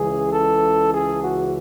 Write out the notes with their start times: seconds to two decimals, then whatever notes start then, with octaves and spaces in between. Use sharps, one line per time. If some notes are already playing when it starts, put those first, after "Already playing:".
Already playing: C#2 C#3 E3 G#4
0.32 A4
0.93 G#4
1.24 F#4